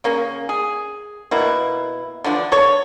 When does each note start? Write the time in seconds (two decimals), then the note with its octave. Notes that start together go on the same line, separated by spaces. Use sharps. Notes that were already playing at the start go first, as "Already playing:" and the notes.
0.04 C#3 A#3 C#4
0.49 G#4
1.31 B2 A#3 E4
2.24 D3 E3 F3 D4
2.52 A4 C#5